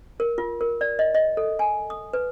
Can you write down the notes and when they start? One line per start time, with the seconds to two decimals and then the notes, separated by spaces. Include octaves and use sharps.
0.20 A#4
0.38 F4
0.61 A#4
0.81 D5
0.99 D#5
1.15 D#5
1.37 A4
1.59 G#5
1.90 D#6
2.13 B4